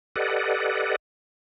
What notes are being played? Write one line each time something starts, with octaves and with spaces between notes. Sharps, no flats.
G4 A4 B4 D5 D#5 F#5